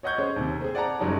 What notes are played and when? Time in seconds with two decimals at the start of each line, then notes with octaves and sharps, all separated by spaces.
0.03 C#5 D#5 F#5 C#6 G6 G#6
0.18 C#4 G#4 C5 C#5
0.36 D#2 C3
0.61 C4 G#4
0.75 D5 F#5 A5 A#5
1.00 F#1 F#3 G3 D#4 C#5 A5